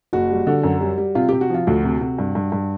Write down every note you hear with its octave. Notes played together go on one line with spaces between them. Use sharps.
F#1 F#4
G3
D3
F#2
G3
G3
C3 F4
C3 G4
F#4
F3 F4
D2 F#4
C3
C3
G2
G2
G2